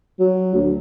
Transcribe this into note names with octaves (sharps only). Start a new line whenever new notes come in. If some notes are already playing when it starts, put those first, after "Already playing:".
F#3
D2